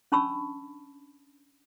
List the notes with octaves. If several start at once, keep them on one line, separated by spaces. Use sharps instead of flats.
C#4 D4 A5 B5 C#6 E6